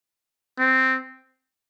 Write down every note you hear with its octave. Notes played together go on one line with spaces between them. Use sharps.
C4